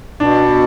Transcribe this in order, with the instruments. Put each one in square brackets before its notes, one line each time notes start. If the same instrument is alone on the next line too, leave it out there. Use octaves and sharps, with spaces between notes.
[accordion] B2 [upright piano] D4